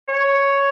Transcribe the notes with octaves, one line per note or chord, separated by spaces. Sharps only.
C#5